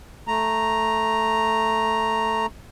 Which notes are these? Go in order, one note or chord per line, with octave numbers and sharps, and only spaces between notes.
A3 A#5